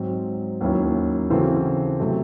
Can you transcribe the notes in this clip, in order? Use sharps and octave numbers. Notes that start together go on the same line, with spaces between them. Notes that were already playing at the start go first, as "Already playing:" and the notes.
Already playing: G#2 F#3 C4
D#2 D#3 F#3 C#4 E4
C#3 E3 C4 F#4 A4
C3 F#3 A3